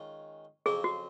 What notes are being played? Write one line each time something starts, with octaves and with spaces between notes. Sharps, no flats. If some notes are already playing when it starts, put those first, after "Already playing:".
Already playing: D#3 G#3 C#4 F4
F2 C#3 F#3 G#4
F#4